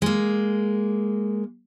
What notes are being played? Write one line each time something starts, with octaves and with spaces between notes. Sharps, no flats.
G#3 A#3